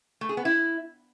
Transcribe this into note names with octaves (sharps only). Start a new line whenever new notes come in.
A3
G#4
B3
E4